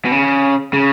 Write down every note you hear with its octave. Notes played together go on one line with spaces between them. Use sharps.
B2
C#3
C#3